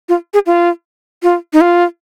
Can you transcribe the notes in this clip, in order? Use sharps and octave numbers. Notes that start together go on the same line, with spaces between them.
F4
G#4
F4
F4
D#4
F4